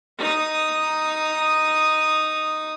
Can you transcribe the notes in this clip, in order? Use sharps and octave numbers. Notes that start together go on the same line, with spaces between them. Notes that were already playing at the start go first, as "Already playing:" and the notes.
D#4 D#6